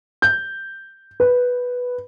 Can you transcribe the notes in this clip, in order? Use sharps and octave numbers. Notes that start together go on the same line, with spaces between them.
G6
B4